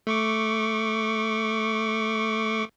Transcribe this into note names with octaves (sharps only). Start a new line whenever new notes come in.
A3 C#6 D6